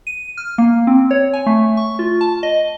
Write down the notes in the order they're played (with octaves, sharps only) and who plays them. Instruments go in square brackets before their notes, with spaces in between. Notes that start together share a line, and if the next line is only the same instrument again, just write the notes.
[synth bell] D#7
F6
A#3
C4
C#5
G#5
A3
C#6
F4
A5
D#5